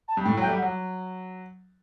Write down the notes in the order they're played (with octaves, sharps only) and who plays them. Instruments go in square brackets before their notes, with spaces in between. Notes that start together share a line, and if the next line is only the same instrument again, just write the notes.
[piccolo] A5
[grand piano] G2
[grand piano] A2 [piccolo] G5
[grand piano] F#3
[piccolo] G5
[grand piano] A3
G3
[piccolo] F#5
[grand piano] F#3